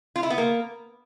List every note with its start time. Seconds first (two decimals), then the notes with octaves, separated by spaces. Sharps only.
0.16 F4
0.23 E4
0.30 B3
0.38 A#3